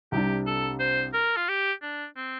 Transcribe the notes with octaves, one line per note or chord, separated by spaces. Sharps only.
C2 C3 G3 D4 G4
A4
C5
A#4
F4
G4
D4
C4